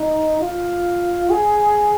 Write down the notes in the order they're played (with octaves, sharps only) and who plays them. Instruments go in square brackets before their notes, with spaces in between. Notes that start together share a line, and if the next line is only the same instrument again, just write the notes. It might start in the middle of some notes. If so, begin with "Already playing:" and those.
Already playing: [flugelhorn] D#4
F4
G#4